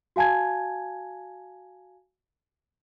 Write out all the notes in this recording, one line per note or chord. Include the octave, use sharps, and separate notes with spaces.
F#4 F5 G#5 A5 G#6